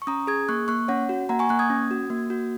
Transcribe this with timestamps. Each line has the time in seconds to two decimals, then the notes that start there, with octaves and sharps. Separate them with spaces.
0.02 C#6
0.07 C#4 A#5 D#6
0.27 G#4 D#6 G#6
0.48 A#3 C#6 F#6
0.68 A#3 C#6 F#6
0.88 C#4 C#5 F#5
1.09 F#4
1.29 A#3 F#5 A#5
1.39 G#5 C#6
1.49 A#3 C#6 F#6
1.59 D#6 G#6
1.70 C#4
1.91 F#4
2.10 A#3
2.30 F#4